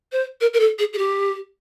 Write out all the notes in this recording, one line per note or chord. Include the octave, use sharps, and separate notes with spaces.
C5
A#4
A#4
A4
G#4
G#4
G4